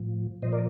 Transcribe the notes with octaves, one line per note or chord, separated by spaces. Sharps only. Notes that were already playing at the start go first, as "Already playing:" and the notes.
Already playing: A2 F3
A#2 F3 C5 D#5
A#4 D5